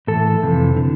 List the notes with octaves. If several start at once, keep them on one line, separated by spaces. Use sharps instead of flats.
A2 E3 A4
F2 C3 E3
D3